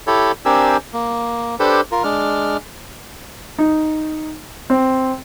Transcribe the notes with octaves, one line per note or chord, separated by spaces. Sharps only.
E4 G4 A4 C#5
C4 D4 G4 A#4 G#5 E6
A#3
D4 G4 A4 B4 C5
F4 A#4
G#3 D4 F6
D#4
C4